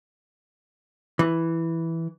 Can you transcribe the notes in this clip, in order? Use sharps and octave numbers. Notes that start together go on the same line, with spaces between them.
E3